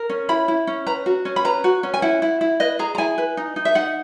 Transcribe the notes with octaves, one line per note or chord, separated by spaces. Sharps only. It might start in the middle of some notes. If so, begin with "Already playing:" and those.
Already playing: A#4
C#4
E4 B5
E4
C#4
B4 A#5
F#4
C#4
B5
B4 A#5
F#4
C#4
G#5
E4 F#5
E4
E4
B4 D#5
G#4 A#5
A#5
E4 G#5
B4
D#4
D#4
E5
D#4 F#5